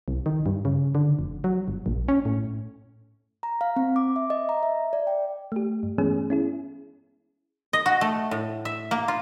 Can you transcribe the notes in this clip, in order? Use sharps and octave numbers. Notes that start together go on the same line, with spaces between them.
C2
D#3
G2
C#3
D3
F1
F#3
G1
A#1
C#4
A2
A#5
F5
C4
D6
E5
D#5
A#5
E5
D5
G5
A3 G4
G2
E3 G#3 A3 B3 C#4 G#4
C#4 E4 G#4
D#5
F#4
A3
A2
E5
A#3
F4